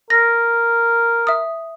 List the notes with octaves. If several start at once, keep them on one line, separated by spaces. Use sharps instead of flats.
A#4 A#6
E5 D#6